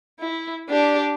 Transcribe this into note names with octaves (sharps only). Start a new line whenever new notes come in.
E4
D4 G4